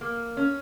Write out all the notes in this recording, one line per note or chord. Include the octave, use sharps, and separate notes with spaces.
A#3
C#4